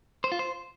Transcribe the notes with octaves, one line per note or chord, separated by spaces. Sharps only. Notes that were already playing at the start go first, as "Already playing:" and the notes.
C5
F4
C5